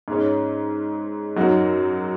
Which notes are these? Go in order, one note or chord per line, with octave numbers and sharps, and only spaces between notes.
G#2 G#3 C#4
F#2 F#3 D#4 F#4